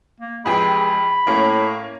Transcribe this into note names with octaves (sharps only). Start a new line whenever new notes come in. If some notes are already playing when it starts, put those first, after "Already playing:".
A#3
F2 C3 E3 G#3 G#4 G5 B5
A2 A#3 C#4